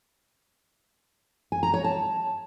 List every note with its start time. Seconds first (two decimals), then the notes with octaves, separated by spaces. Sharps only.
1.52 G#5
1.63 A#5
1.74 C#5
1.84 A5